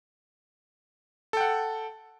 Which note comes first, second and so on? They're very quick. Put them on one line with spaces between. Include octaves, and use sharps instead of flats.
A4 G5 F#5